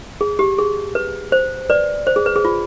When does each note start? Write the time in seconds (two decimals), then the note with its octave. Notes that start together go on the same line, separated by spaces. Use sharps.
0.21 G#4
0.39 G4
0.58 G#4
0.95 B4
1.32 C5
1.70 B4 D5
2.07 C5
2.16 G#4
2.26 B4
2.36 G#4
2.45 F4